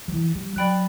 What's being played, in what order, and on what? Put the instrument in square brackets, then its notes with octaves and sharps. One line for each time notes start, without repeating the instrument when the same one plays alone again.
[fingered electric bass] F#3
E3
G3
[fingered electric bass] F#3 [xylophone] D5 G5 B5 F#6